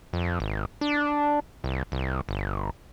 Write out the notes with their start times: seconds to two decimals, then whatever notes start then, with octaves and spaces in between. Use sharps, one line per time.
0.13 F2
0.40 G#1
0.81 D4
1.64 C2
1.92 C2
2.29 G1